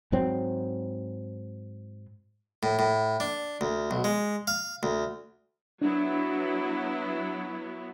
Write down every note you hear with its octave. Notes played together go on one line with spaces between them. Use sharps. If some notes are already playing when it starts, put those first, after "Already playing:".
G#2 F#3 C4
A2
A2
D4
D2
B1
G#3
F5
D2
F#3 B3 D4 E4